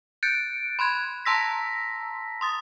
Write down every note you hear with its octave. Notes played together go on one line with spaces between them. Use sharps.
F#6 G6 A6 C#7 D7
B5 C6 F#6 G#6
A5 A#5 C6 E6 A#6 B6
C6 D#6 A6